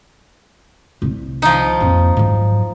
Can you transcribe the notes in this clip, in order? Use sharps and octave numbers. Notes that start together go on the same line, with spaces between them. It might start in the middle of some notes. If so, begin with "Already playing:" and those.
C2 C3
F3 D#4
F2 A#3
G#2 F#3